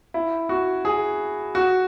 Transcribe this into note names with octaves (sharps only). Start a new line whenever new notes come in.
E4
F#4
G#4
F#4